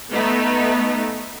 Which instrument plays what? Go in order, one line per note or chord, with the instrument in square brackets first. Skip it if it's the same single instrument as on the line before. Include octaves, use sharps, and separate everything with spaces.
[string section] A3 B3 D#4